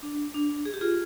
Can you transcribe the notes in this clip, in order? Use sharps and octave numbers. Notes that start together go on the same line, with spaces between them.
D4
D4
G#4
G4
F4 G#4